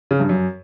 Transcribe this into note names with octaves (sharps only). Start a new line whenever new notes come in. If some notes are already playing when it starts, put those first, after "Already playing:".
C#3
G2
F#2